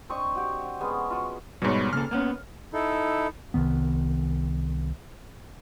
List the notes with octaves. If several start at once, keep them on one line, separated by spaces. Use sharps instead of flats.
C4 D4 D#5 C#6
F#4 G4
G#3 B3 C#4 G#4
F4 F#4
G#2 B2 G3 B3 C#5
C#3 A#3 A4 F6
A#3 B3 C#4
D#4 E4 A4
C2 D#3 B3